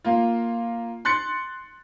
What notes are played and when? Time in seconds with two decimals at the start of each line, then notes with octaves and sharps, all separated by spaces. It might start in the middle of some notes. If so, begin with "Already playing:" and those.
0.04 A#3 F4
1.05 C6 F#6 A6 C#7